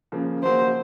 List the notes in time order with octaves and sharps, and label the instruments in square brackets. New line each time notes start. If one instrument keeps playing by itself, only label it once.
[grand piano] C#3 F3 A#3
[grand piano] C#3 F#3 A#3 [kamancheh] C5